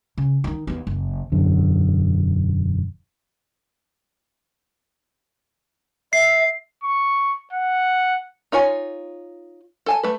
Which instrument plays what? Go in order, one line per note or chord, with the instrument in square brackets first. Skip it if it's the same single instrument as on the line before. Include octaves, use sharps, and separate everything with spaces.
[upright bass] C#3
D#3 D#4
D#2 B3
F#1
[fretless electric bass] E1 F#2 D3
[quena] E5 [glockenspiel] C7
[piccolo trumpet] C#6
F#5
[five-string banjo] D#4 F4 C#5 G#5
A4 G#5 A5
A3 B4